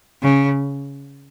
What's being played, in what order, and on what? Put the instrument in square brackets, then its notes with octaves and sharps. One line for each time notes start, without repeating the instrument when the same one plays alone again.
[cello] C#3